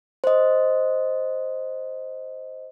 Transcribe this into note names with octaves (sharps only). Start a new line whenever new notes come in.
C5 D#5